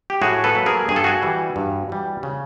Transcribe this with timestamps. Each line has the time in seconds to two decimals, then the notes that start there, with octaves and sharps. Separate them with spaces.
0.10 G4
0.22 A2 F#4 G#4
0.44 A4 B4
0.55 F#3 A#3
0.66 G#4 A#4
0.88 G2 G#4
0.96 A4
1.04 F#4 G#4
1.22 E3 G3
1.56 G2
1.90 E3 G3
2.23 C#3